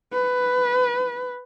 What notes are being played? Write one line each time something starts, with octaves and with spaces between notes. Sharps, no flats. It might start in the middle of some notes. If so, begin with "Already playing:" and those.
B4